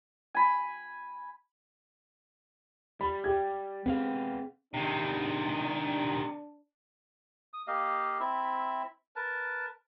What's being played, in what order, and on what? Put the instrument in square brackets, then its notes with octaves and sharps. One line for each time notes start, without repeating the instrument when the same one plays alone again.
[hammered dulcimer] G#5 B5
[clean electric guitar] G3 [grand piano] B5
[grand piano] G4 G#6
[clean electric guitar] B3 G#4 F5 [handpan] C4
[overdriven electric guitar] C3 D#3 [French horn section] D4
[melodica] D#6
A#3 G4 D#5 F5
C4 E4 E5
A#4 B4 A5